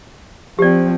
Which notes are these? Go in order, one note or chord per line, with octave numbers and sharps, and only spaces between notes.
F3 C4 G4 D5